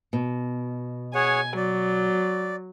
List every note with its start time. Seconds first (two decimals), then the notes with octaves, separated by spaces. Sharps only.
0.13 B2
1.15 G#4 C#5 F#5 G#5
1.57 F#3 D5